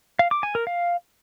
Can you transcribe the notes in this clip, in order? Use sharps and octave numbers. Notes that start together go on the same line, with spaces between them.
F5
D6
G#5
A#4
F5